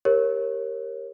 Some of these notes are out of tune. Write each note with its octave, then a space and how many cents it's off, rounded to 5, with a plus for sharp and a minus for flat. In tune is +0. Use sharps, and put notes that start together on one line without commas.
G4 +5 A#4 +0 C#5 -25